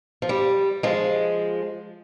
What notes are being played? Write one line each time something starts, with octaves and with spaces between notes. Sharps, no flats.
F3
G3
F3 G#3